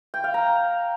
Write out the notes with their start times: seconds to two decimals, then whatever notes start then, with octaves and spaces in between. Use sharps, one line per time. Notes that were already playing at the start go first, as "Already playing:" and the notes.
0.14 G5
0.24 F5
0.34 A#5